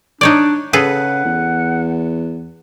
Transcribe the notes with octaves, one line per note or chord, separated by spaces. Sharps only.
D4 D#4 C#5 D5
C#3 G#4 A4 B4 F#5
E2